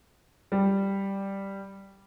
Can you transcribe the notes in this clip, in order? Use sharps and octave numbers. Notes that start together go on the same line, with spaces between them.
G3